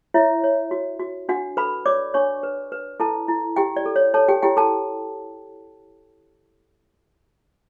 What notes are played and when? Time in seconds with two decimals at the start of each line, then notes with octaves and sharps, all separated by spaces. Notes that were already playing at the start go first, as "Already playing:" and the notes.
0.14 E4 C#5 E5
0.44 C#5
0.71 F#4
1.00 F#4
1.29 D4 F#4 F#5
1.57 A4 B4 B5
1.86 C#5 D5 D6
2.14 D4 C#5 C#6
2.43 B4
2.72 B4
3.00 E4 A4 A5
3.28 E4
3.56 E4 G4 G5
3.77 D5
3.86 A4
3.96 C#5
4.14 A4 C#5 A5
4.28 G4 G5
4.43 E4 G4 G5
4.57 A4 A5